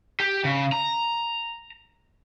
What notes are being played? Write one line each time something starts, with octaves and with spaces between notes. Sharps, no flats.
G4
C#3
A#5